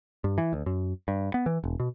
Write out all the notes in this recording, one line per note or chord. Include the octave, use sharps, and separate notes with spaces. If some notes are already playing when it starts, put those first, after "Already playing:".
G2
E3
D2
F#2
G2
B3
E3
E1
B2